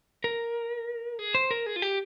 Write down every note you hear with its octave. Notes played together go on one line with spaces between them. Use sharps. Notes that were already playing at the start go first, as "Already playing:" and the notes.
A#4
G#4
C5
A#4
G#4
F4
G4